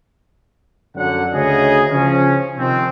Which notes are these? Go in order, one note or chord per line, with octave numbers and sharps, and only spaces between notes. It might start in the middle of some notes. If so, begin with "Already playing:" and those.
F#2 D3 F#3 F#5
D2 C#3 C#4 G#4 D#5
C#3 F3 C#4
C3 D#3 F3 C4